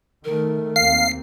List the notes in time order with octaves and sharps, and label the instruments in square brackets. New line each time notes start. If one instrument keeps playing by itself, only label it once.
[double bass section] D#3 A3 [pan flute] A#4
[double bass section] D#2 A#3 C4 [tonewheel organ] F5 [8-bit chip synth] C7